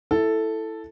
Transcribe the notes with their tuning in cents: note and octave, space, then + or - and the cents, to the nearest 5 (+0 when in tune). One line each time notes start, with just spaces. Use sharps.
E4 +0 A4 +0